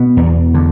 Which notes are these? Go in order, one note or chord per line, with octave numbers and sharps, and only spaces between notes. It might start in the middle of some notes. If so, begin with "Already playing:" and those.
Already playing: B2 B3
E2
D3